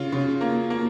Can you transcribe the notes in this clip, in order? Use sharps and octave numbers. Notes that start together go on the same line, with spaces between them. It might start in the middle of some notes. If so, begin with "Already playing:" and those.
Already playing: C#3 F4
C#3
A#3
A#3